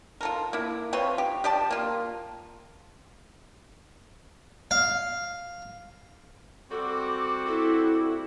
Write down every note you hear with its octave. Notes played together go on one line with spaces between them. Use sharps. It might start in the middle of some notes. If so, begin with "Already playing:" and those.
F4 A4 A#4
A#3 E4
C4 F4 B4 C#5
G4
G4 D5 A5
A#3 F4
F5
G3 C4 F#4 A4 D6
E4 A4